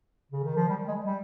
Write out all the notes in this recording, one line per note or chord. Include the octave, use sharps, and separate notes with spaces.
C#3
D#3
F3
G3
G#3
G3